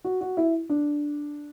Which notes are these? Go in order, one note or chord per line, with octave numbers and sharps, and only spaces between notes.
F#4
F#4
E4
D4